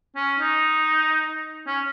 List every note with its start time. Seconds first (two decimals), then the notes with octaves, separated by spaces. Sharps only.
0.16 C#4
0.39 D#4
1.67 C#4